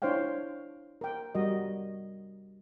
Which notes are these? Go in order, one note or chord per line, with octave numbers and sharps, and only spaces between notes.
D4 E4 C5 C#5 F5 G5
A#4 G5
G3 F#4 A#4 D#5